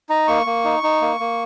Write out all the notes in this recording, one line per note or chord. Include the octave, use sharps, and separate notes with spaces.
D#4 A#5
A#3 C#6
A#3
D#4
D#4
A#3
A#3